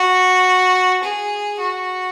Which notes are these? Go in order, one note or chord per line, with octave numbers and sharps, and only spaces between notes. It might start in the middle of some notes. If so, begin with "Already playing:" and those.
Already playing: F#4
G#4
F#4